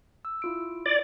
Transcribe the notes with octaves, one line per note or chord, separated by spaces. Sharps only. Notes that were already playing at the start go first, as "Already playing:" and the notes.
E6
E4 F4 D7
D5